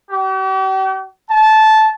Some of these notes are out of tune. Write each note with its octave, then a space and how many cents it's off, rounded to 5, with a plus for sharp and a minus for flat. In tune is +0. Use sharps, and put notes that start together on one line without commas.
G4 -45
A5 -15